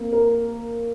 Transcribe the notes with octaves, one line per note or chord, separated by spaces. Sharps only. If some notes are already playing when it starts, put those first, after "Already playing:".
Already playing: A#3 C4
A#4